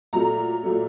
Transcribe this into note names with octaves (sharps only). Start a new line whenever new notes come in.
A#2 F#3 A3 A#5
A#2 F#3 A3